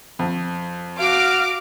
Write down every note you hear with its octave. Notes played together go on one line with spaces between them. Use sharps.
F2
F#4 F5 D6 F6